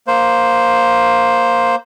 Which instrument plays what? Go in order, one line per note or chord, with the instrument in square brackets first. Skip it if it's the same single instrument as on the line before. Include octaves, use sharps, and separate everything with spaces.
[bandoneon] A#3 C5